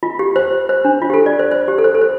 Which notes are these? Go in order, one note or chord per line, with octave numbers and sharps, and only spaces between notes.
F4
G4
C5
C5
D4
F4
G4
A4
D5
C5
C5
G4
A4
C5
A4
C5